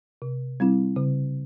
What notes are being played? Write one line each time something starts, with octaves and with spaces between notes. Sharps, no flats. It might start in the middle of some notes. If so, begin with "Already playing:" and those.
C3
G3 C4 E4
C#3